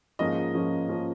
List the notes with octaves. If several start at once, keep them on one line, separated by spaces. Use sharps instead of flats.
G#2 F3 A#3 C#4 D#5
G#2 F3 A#3 C#4
F3 A#3 C#4